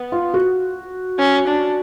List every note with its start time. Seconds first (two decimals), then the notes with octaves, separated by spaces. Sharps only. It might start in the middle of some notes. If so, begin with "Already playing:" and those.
Already playing: B3
0.12 F4
0.34 F#4
1.19 C#4
1.47 D4